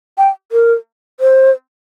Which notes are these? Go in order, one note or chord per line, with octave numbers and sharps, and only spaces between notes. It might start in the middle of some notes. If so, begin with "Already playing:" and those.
G5
A#4
C5